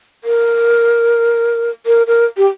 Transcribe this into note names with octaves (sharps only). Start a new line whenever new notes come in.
A#4
A#4
A#4
G4